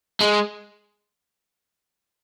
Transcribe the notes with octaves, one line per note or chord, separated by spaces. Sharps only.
G#3